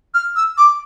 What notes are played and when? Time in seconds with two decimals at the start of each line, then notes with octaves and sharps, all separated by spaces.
0.14 F6
0.36 E6
0.58 D6